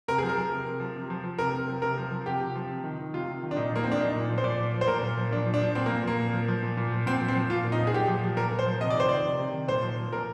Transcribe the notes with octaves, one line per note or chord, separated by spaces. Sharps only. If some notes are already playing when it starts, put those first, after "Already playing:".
C3 A#4
F3 G#4
A#4
F3
C3
C3
F3
C3
F3
F3
C3 A#4
C3
F3
C3 A#4
F3
F3
C3 G4
C3
F3
C3
D#3
D#3
C3 F4
C3
D#3
D4
A#2 D#4
F3 A#3
F3 C4
D4
A#2 D#4
A#2
F3
C5
A#2 D5
F3
F3
C5
A#2 A#4
A#2
F3
A#2 D4
F3
D4
F3
A#2 C4
A#2 A#3
F3 A#3
A#2
F3
F3
A#2
A#2
F3
A#2 C4
F3
C4
F3
A#2 F4
A#2
D#4
F3
G#4
A#2 G4
F3
F3
A#2 A#4
A#2
C5
F3
C3 D#5
D5
D#3 C5
D#3 D5
C3
C3
D#3
A#2 C5
F3
F3
A#2 A#4